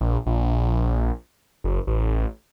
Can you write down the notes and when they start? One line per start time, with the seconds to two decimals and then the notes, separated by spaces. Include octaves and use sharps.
0.01 A#1
0.26 A#1
1.64 F#1
1.87 A1